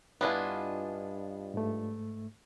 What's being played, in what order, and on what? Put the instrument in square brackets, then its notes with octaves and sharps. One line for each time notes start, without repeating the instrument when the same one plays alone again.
[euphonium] G2 [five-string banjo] B3 D4 E4 [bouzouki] F4 D#5 G#5
[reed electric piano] G#2 A3